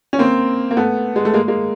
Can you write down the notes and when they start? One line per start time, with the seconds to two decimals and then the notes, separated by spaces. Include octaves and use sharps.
0.13 C#4
0.19 A#3 C4
0.71 A#3
0.77 A3 B3
1.16 G#3
1.25 A3
1.34 G#3 A#3
1.48 G#3 A#3